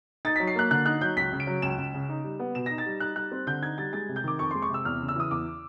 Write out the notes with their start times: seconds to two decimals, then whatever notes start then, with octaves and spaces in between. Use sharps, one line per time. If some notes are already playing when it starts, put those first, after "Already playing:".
0.25 D#4 A6
0.36 F#3 B6
0.47 C7
0.55 A#3 F#6
0.71 D3 F#6
0.86 D#4 F#6
1.01 F#3 G6
1.16 C#2 B6
1.32 C#3
1.40 D7
1.47 F#3
1.62 C#2 E7
1.78 C#2
1.94 C#3
2.09 D#4
2.24 G3
2.39 B3
2.55 B2 E7
2.66 D#4 A#6
2.78 A6
2.86 G3
3.00 D#4 F#6
3.16 G3 F#6
3.32 C4
3.47 D3 G6
3.62 D#4 G#6
3.78 G3 A6
3.93 G#3 A6
4.09 C3
4.16 G6
4.23 D#3 D6
4.39 F2 C#6
4.51 G#3 C6
4.62 C#6
4.70 C3 E6
4.85 E2 F6
5.00 C#3
5.08 E6
5.16 E3 D#6
5.31 E2 D6